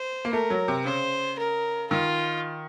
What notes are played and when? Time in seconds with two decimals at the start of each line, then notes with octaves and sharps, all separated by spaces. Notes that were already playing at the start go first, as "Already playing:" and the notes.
Already playing: C5
0.25 A#3
0.33 A3 A#4
0.50 F#3
0.68 C3
0.85 C#3 C5
1.38 A#4
1.91 D#3 F4